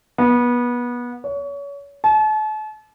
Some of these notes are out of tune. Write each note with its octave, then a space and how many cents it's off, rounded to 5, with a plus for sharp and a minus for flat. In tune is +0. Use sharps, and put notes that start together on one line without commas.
B3 -25
C#5 +30
A5 -40